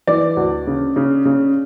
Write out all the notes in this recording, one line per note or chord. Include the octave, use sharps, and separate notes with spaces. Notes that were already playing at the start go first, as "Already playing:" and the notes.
E3 D5
D2
C#3
C#3
C#3